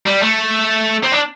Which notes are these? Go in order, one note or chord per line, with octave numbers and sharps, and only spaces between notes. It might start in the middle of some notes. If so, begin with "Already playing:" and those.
G3
A3
C4
D4